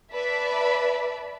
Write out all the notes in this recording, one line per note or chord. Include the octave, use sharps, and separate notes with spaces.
B4 D5 E5 A5 B5